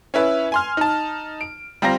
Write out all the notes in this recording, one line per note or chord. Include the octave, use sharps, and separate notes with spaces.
C#4 E4 B4
G#5 C6 F6
D#4 A5
D7
G3 C4 F4 A#5 A#6